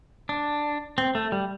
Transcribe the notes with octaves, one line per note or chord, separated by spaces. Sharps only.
D4
C4
A3
G3